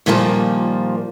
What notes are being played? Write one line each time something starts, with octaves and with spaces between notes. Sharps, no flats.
A#2 D#3 F3 G3 A3 A#3